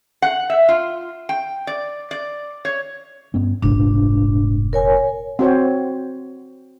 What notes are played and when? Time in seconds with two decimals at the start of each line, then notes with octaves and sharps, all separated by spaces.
0.22 F#5
0.50 E5
0.69 F4
1.29 G5
1.67 D5
2.11 D5
2.65 C#5
3.34 G2 B3 C#4
3.62 F1 A#1 G#2 D4
4.73 A#4 C#5 G#5
5.39 C4 F#4 C5 C#5